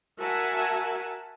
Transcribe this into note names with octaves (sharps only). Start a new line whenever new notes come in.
F#4 A#4 E5 F#5 G#5 A5